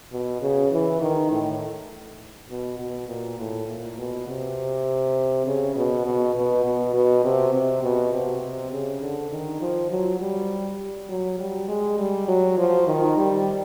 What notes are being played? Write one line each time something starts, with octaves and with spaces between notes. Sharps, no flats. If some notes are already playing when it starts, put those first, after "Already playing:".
B2
C#3
E3
D#3
A2
B2
B2
A#2
A2
A#2
B2
C3
C#3
B2
B2
B2
B2
B2
C3
C3
B2
C3
C3
C#3
D3
D#3
F3
F#3
G3
F#3
G3
G#3
G3
F#3
F3
D#3
G3